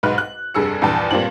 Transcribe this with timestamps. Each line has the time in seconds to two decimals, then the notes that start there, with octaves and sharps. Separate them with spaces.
0.03 B1 G#2 B4 F#6
0.18 F#6
0.54 F1 G2 G#4 E6 C#7
0.82 A#1 E2 G2 G5 A5
1.11 G2 A#2 C4 D4 F#7